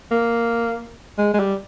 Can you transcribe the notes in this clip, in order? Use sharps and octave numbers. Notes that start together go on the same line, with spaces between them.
A#3
G#3
G#3
G3